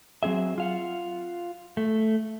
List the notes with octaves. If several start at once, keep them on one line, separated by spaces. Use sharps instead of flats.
F#3 C4 G#4 E5
F4 F5 F#5
A3